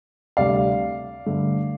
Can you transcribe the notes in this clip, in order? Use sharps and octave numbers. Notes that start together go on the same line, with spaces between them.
D2 C3 G3 D5 F5
G2 D3 A3